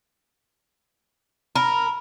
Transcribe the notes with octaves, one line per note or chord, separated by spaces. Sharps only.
A#4 B5